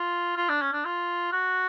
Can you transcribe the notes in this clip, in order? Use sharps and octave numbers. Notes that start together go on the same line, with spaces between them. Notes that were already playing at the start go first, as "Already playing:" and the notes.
Already playing: F4
F4
D4
C#4
D4
F4
F#4